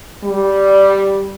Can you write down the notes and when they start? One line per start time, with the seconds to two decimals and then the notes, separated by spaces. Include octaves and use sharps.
0.23 G3